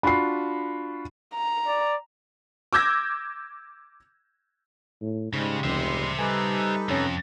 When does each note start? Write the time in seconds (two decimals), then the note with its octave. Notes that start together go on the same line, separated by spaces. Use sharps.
0.03 D4 F4 F#4 B5 C7
1.34 A#5
1.67 D5
2.73 D6 E6 G6 G#6 A#6
5.02 A2
5.33 G#2 C#3 G3 G#3
5.64 F1 D2 C#3 F3 C5 E5
6.19 G3 D#4 A4 B4 G#5 D6 D#6
6.89 F2 C3 C#4